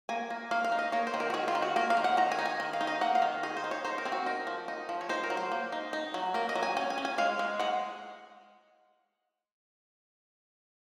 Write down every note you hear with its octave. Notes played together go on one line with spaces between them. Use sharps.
A#3 G#5
A#3
A#3 F5
F5
D#4
D#5
A#3 C#5
C5
D#3
A#4
F#4
D#3 G#4
F4
D#3
F#4
A#3 A#4
F5
D#3
F#5
D#3 A#5
G#5
D#4
G#5
D#3
F5
D#4
D#5
A#3 F#5
F5
D#3
D#4 G#4
C5
D#4
C#5
D#4 C5
A#4
C4 G#4
F#4
D#4 A#4
F3
D#4
F3
C#5
D#4 C5
A#4
F#3
C5
A#3
D#4
D#4
F#3
A#3 A#4
D#5
F#3
G#5
C#4 G#5
G#5
C#4
G#5
G#3 F5
G#3
G#3 F#5